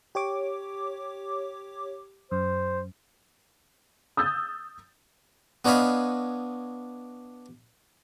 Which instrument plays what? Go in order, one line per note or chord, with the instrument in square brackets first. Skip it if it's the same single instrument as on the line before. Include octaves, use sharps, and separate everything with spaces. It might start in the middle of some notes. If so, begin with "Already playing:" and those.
[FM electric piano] G4 C#5 D6
[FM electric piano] F#2 [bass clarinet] C5
[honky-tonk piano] D#6 E6 G6 A6
[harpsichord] B3 D4 C#5 D#5 F5 B5